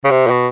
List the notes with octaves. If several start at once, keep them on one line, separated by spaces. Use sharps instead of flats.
C#3
C3
A#2
B2